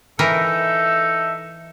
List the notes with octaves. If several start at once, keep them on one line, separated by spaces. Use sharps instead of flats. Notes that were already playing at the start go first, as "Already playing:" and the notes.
E3 D#4 A4 A#4 E5